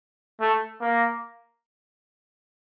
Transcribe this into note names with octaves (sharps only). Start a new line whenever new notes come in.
A3
A#3